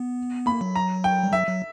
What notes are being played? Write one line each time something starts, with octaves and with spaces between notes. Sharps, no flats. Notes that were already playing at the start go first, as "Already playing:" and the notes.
Already playing: B3
A#3 B5
F#3
A#5
G5
G3
F#3 E5
F#3